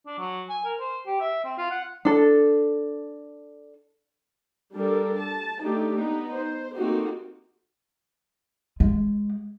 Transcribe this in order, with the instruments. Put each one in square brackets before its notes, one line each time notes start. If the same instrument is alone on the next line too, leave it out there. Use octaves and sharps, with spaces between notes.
[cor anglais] D4
F#3
G#5
A#4
C5
G4
E5
C4
F4
F#5
[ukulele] D4 A4
[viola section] G3 D4 A4 A#4
A5
A3 D4 D#4 G4
B3 D#4
C5
A3 A#3 C4 D#4 F#4 G4
[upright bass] G#3